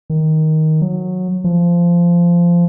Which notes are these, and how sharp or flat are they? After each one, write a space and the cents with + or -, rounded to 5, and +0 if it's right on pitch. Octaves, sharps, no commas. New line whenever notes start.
D#3 +10
F#3 -15
F3 -15